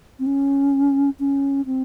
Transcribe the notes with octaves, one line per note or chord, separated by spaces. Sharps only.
C4
C#4
C#4
C4